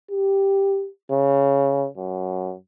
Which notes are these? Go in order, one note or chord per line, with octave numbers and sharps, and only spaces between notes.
G4
C#3
F#2